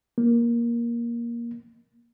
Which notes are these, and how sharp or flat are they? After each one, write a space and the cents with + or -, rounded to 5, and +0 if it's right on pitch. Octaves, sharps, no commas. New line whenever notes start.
A#3 +15